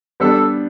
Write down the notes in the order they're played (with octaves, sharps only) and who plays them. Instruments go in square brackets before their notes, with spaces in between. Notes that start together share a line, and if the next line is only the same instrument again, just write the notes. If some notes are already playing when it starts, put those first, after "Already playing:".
[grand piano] G3 B3 D4 [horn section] A4